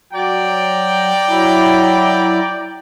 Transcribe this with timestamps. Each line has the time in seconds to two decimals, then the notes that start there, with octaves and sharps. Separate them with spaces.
0.13 F#3 D5 G5 A#5
1.28 F#3 E4